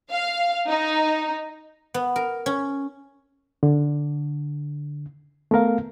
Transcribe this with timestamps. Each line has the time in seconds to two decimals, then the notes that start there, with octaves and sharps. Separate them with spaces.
0.10 F5
0.68 D#4
1.94 B3
2.16 A#4
2.46 C#4
3.63 D3
5.51 A3 B3 A#4 F5